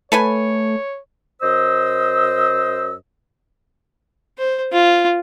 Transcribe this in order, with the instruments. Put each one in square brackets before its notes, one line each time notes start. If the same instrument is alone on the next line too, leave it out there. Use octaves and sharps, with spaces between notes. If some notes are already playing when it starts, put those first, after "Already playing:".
[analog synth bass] A3 [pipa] A4 B4 G#5 [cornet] C#5
[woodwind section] F#2 C5 D#5 E6
[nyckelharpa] C5
F4